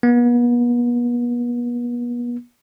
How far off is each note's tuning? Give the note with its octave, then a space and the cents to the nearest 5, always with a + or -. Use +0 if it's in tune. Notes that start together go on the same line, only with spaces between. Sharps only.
B3 -40